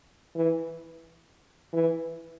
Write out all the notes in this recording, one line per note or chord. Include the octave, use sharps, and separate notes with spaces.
E3
E3